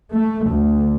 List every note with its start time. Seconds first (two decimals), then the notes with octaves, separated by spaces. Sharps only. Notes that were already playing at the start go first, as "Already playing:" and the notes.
0.14 A3
0.48 D2